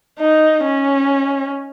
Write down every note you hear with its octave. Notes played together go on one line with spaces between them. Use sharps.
D#4
C#4